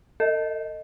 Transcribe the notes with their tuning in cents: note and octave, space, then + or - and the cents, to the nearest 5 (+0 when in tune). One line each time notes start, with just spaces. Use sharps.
A4 +45 D#5 +0